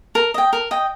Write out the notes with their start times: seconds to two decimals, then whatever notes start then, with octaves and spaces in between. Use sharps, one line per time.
0.15 A#4
0.34 D#5 G5
0.53 A#4
0.71 D#5 G5